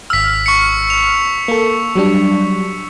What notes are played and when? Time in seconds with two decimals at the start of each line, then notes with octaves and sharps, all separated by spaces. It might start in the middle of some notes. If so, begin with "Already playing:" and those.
0.10 G#1 E6 F6 B6
0.46 C#6 C#7
0.90 F7
1.48 A#3 A4
1.95 F#3 G3 D4